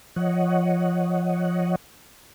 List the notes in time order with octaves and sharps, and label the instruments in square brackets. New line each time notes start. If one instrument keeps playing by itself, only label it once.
[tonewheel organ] F3 C#5 D#5 F#5